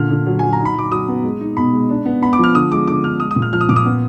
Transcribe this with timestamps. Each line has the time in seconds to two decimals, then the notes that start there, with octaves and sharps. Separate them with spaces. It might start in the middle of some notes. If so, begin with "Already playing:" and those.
Already playing: A#2 D3 F6
0.10 D3
0.27 F#3
0.39 F#3 G#5
0.53 A#5
0.59 D#4
0.65 B5
0.75 F#3 D6
0.91 F#3 D#6
1.08 B3
1.24 G#3
1.41 D#4
1.57 B2 B5
1.73 G#3
1.89 D4
2.06 B3
2.22 B3 B5
2.33 D6
2.39 F3 F6
2.55 D3 D#6
2.71 G#3 D6
2.87 D3 D6
3.04 D3 F6
3.20 G#3 D#6
3.31 D#6
3.36 A#2
3.42 F6
3.53 F3 F6
3.61 D#6
3.69 A#2 D6
3.76 D#6
3.85 B3